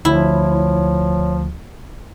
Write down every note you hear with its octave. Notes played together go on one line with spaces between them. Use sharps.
D2 F3 E4 C#5